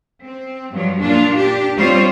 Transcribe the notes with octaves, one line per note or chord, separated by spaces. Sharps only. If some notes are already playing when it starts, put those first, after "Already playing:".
C4
G2 F3 F#3
A#2 D4 F4
D4 G4
G3 C4 F4 C5 C#5